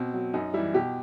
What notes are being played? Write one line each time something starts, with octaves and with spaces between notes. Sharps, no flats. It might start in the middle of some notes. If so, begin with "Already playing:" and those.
Already playing: B2 C4
F#3
F#2 D#4
E3 G3 E4
B2 G4